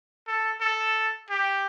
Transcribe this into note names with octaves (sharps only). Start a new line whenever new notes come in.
A4
A4
G4